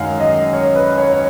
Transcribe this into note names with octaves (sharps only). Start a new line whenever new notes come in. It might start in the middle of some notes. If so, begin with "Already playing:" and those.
Already playing: F#2 D#3 G#3 F5 F#5 G#5
D#5
C#5
B4
C#5
C#5